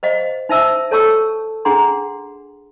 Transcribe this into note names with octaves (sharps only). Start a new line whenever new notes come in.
C5 D#5 F5
D#4 C5 E5 A5 E6
A4 C#5 A5 C#6 E6
D4 G#4 F#5 A#5 C6